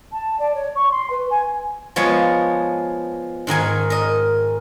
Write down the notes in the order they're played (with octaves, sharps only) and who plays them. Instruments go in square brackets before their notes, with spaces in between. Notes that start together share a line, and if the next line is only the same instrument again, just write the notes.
[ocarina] A5
D5
C#5
C#6
C6
B4
G#5
[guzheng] F3 G#3 B3 C#5
G#2 D#3 A#4 G#5
A#4 D#5